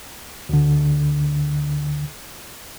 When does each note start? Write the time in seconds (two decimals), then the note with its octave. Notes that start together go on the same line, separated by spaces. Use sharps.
0.49 D2 D3